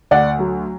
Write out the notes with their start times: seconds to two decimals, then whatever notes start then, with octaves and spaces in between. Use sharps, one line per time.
0.11 D2 D5 F#5
0.39 F#3